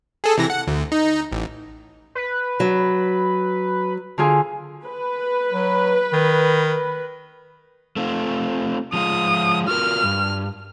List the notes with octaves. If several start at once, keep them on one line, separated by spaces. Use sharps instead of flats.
G#4 A4
C3 E3 A#6
F#5
D2
D#4
A1
B4
F#3
D3 F4 G#4
B4
F#3
D#3
A3 C4 F4
F3 G#3 F4 D#6
F4 F#4 A#4 F6
G2